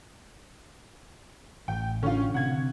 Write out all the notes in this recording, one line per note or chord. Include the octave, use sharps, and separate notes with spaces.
A1 G5
D3 C#4 F4
C3 F#5 G#6